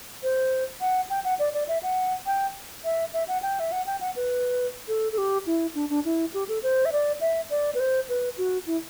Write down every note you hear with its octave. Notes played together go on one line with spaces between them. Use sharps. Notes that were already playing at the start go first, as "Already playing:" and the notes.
C5
F#5
G5
F#5
D5
D5
E5
F#5
G5
E5
E5
F#5
G5
E5
F#5
G5
F#5
B4
A4
A4
G4
E4
D4
D4
E4
G4
A4
C5
E5
D5
E5
D5
B4
C5
B4
F#4
E4